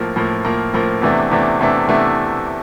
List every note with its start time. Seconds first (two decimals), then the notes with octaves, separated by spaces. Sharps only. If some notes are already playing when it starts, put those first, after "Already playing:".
Already playing: A2 F3 A#3
0.16 A2 F3 A#3
0.45 A2 F3 A#3
0.73 A2 F3 A#3
1.02 E2 C3 E3 A3 D4
1.31 E2 C3 E3 A3 D4
1.59 E2 C3 E3 A3 D4
1.88 E2 C3 E3 A3 D4